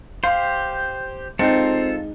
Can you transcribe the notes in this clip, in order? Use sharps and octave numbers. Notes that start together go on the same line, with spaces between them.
G4 C5 F5
G#3 C4 D#4 F4 A4